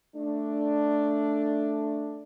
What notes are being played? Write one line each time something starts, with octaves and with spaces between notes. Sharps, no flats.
A3 D4